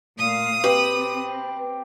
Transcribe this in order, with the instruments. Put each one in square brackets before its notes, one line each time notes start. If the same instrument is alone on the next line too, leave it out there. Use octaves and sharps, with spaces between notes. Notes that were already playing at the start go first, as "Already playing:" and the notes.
[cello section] A#2 A3 F5 [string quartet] D#6
[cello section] C4 [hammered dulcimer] G4 [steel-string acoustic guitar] B4